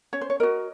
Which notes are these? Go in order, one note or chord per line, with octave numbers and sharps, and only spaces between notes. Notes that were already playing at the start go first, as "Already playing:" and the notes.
C#4 C#5
C5
C#5
F#4 A#4 D#5